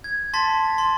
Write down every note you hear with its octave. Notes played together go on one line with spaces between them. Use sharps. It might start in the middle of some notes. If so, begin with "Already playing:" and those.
G#6
A5 C6 A6 B6
C6